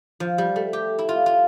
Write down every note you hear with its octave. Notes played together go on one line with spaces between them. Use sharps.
F3
G3
A3
G4
E4
F4
F4